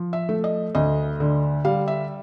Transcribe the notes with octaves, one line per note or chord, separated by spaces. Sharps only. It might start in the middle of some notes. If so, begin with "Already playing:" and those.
Already playing: F3
E5
A3
D#5
D2 D#5
D3
G3 F5
E5